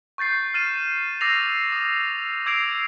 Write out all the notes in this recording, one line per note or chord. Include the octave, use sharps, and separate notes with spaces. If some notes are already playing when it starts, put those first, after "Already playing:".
C#6 G6 A6 C7
F6 A6 D#7 E7
D6 E6 A6 A#6 C7 F7
D#6
D6 E6 G#6 C7 D7 F7